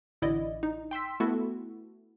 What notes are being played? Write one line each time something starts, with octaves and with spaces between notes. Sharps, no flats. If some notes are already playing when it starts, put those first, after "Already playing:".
A1 D3 E4 D5 D#5
D#4
G5 C6 E6 B6
A3 B3 E4 F#4 A4